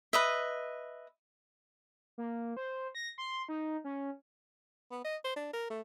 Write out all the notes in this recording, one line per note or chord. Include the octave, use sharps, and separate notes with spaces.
B4 D#5 E5
A#3
C5
A#6
C6
D#4
C#4
B3
D#5
C5
D4
A#4
A3